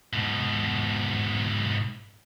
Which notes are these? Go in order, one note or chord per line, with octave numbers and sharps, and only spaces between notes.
G#2 B2